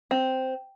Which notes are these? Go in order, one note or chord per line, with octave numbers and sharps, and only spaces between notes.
C4